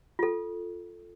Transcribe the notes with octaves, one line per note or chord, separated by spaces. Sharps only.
F4 A4